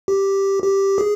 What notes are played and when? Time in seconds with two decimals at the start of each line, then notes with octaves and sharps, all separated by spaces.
0.08 G4
0.63 G4
0.98 G#4